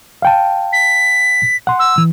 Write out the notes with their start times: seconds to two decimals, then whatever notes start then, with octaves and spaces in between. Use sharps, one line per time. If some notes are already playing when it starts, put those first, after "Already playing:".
0.22 F5 G5 A5
0.73 B6
1.67 F#5 C6
1.79 E6
1.98 E3